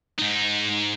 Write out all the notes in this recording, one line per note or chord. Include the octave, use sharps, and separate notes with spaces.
G#2 D#4